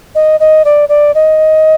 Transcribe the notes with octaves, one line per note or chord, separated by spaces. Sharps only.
D#5
D#5
D5
D5
D#5